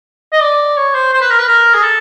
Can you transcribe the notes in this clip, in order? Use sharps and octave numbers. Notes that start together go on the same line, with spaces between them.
D#5
D5
C#5
C5
C5
B4
A#4
B4
A#4
G#4
A4